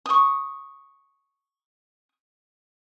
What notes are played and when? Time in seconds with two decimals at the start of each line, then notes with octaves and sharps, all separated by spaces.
0.06 C#6 D#6